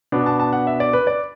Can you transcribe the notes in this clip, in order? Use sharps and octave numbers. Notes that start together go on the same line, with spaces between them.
B2 B3 D4
A5
A5
F#5
E5
D5
B4
D5